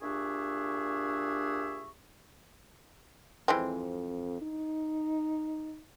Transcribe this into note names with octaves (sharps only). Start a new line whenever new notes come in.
A#2 D4 G4 G#4 E5 C#6
F2 E3 G#3 C4
D#4